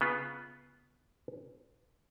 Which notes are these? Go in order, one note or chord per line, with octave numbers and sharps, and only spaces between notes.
C#3 B3 F4 B4